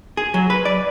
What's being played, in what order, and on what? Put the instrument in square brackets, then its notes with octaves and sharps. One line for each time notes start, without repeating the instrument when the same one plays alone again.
[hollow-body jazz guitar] G#4
F#3
B4
D5